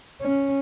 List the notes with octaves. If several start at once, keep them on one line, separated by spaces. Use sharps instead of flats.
C#4